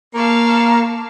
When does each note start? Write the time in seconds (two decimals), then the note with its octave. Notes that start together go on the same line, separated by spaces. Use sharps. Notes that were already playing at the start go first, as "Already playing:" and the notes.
0.14 A#3 F5 A5 C#6